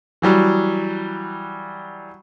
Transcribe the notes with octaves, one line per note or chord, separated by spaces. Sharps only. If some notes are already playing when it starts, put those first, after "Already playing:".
E3 F#3 G3